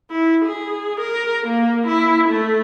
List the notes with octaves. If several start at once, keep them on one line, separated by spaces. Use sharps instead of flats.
E4
G#4
A#4
A#3
E4
A3